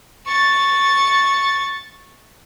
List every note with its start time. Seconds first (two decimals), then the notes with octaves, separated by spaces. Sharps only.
0.26 C#6 A6